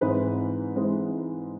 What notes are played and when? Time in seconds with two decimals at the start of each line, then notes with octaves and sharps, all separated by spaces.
0.01 G#2 E3 G#3 C4 D#4 B4
0.76 E3 G#3 C4 D#4